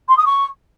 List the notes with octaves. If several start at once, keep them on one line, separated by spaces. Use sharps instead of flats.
C6
D#6
C#6